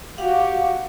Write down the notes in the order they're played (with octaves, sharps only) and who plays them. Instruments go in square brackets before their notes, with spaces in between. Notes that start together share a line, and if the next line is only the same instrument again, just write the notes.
[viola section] F#4 G4 [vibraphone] F5 F#5